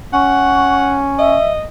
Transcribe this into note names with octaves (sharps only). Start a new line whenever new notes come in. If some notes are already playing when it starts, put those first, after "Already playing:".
C#4 F#5 C#6
D#5 E5